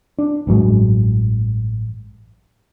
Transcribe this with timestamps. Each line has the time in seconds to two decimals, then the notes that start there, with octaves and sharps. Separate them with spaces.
0.18 D4
0.47 A1 G2 F#3 G#3